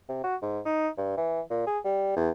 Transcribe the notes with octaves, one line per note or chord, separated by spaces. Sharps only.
C3
F#4
G#2
D#4
G2
E3
A#2
G#4
G3
E2